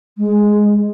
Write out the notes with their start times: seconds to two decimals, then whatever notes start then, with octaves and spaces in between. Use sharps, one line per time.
0.18 G#3